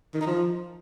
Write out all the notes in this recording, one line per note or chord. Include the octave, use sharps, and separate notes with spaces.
D#3
D#4
F3